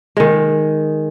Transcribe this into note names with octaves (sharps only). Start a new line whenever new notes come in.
D#3 G#3